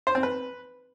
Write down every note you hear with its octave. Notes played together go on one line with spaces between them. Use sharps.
C5
C4
B4